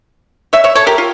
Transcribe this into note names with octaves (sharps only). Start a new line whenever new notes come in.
C#5 E5
C#5 E5
A4 C#5
G4 A#4
F4